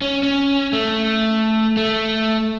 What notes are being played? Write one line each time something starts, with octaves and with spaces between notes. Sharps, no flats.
C#4
C#4
A3
A3